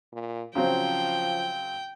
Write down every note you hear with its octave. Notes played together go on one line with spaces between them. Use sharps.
A#2
C#3 F3 F#3 C4 G5